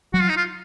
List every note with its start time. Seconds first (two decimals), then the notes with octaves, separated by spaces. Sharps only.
0.13 F#3 F#4
0.21 F4
0.29 D#4
0.36 F4